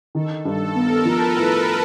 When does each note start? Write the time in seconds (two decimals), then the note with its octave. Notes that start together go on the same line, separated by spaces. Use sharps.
0.15 D#3 A4
0.45 G2 A4
0.75 B3 A#4
1.05 F3 B4
1.36 A2